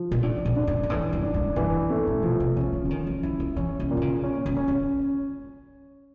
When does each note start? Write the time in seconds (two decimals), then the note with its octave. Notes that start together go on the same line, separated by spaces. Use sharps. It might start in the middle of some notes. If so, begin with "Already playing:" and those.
Already playing: F3
0.11 A#2
0.22 A2 D4
0.45 A#2
0.56 D4
0.67 G#2
0.83 G#2
0.90 A2 E3
1.13 G2
1.23 D4
1.34 G#2
1.56 G2 E3
1.74 G#2
1.90 A3
2.07 A#2
2.23 B2 F3
2.40 C3
2.56 C#3 C#4
2.73 D3
2.85 E3
2.90 D#3 C#4
3.07 E3
3.23 D#3 E4
3.40 D3
3.56 E3 C#4
3.80 D#3
3.91 A#2
3.97 D3
4.02 C#3
4.23 C#4
4.46 D#3
4.57 C#4
4.68 D#3